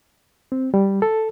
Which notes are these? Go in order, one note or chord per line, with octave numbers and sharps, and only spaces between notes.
C4
G3
A4